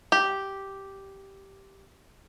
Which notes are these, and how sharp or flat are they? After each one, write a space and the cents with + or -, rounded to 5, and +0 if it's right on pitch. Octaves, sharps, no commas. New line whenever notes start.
G4 -5